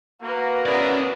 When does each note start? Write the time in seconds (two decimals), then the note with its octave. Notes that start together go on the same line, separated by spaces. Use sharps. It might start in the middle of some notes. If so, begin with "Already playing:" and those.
0.22 A#3 F#4 B4
0.66 C#4 E4 G#4 A#4 D5